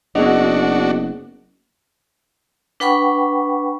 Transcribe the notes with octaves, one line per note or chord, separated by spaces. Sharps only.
F#1 B3 D4 F#4 G#4 D#5
D4 B4 F#5 G5 B5 C#6